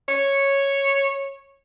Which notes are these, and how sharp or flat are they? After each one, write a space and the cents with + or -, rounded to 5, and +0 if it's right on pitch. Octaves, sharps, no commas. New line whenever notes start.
C#5 -5